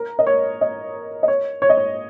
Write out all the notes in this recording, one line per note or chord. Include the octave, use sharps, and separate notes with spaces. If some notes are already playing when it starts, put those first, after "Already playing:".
Already playing: A#4
D#5
C#5
D#5
D#5
C#5
C#5
D#5
C#5